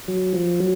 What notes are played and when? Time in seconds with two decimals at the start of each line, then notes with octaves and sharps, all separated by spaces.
0.08 F#3
0.33 F3
0.60 F#3